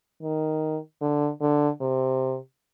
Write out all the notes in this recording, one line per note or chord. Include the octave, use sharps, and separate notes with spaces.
D#3
D3
D3
C3